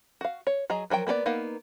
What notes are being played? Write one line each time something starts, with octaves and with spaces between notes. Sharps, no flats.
F#4 F5
C#5
F#3 G#4 D#5 A#5
F3 F#3 A#4 G5
A#3 B3 A4 D5
A#3 B3 D#4 F5